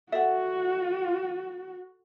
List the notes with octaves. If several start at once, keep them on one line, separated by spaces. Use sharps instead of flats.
F#4 A4 E5 F#5